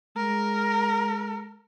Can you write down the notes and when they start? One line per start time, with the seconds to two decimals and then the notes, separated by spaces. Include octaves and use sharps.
0.16 G#3 A#4